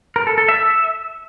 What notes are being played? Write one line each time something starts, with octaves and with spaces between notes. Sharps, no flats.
A#4
A4
A4
E5